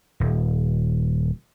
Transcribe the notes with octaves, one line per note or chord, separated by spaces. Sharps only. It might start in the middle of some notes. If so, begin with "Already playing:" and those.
D#1